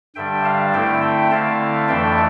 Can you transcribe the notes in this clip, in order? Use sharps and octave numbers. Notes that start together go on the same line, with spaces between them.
G2 D3 G3 D4 E5 G5
F5 A5
D3 A3 C4 E4 E5 G5
E5 G5
D3 A3 C4 E4 F5 A5
F2 E3 A3 D4 E5 G5